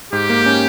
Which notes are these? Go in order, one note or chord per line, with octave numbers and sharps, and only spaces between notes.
G#2 G4
A#3
C#4